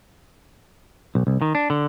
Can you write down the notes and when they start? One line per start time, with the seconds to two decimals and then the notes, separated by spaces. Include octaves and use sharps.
1.15 B1
1.27 C2
1.42 D#3
1.55 D4
1.70 D3